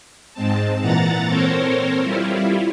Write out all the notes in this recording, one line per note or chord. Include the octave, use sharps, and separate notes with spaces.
G#2 G#3 C4 A5
A#2 E3 F#5 A#5 A6
C4 A4 A#4 C5 C#5
G3 E4 F4